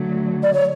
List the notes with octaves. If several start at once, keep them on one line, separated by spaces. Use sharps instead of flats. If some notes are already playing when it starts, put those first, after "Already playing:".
Already playing: D3 F#3 A3
D5
C#5